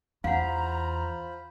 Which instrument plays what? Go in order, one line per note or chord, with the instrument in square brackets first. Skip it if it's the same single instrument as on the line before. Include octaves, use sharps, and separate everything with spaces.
[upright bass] E2 [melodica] F4 C5 B5 [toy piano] F5 F#5 [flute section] A#5